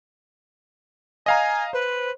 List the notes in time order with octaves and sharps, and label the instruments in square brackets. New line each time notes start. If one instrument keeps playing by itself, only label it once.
[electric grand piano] D#5 F5 A#5 [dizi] G#5
[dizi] B4 [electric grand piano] C5